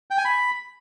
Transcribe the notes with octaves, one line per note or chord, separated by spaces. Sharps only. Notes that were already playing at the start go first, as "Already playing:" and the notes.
G5
G#5
B5